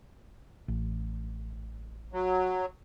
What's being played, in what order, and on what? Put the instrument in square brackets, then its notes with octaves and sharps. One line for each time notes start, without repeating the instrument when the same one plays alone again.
[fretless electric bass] A1
[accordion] F#3